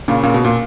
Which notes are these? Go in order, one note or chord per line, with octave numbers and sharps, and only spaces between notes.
A#2 C#3
A#2 C#3
B2
A#2